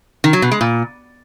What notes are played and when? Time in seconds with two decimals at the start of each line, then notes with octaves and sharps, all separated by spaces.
0.24 D#3
0.33 F#3
0.42 B2
0.51 G#3
0.61 A#2